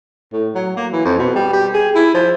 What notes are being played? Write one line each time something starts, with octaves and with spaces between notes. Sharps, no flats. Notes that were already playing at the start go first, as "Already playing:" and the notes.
A2
F#3
A#3
E3
F2
B2
G3
G4
G#4
E4
F3